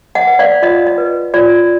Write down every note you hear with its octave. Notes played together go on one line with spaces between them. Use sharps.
D#5 F#5
B4
D5 F5
F4 D#5
D#5
B4
F4 D5